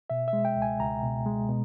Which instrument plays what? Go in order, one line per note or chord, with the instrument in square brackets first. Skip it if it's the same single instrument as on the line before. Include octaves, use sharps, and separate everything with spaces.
[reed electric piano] B2 E5
E5
G#3
G5
C#2
G#5
C#2 A#5
B2
G#3
B2